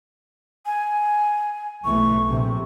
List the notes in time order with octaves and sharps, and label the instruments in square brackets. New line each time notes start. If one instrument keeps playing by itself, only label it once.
[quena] G#5
[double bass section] B1 E3 A3 [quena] C#6
[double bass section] A#1 C3